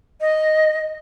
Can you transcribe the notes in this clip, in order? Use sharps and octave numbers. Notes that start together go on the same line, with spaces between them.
D#5